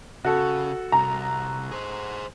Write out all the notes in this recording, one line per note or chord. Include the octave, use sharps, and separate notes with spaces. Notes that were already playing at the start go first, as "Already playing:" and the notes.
C#3 F#4 A4
C2 A#5
G#4 C5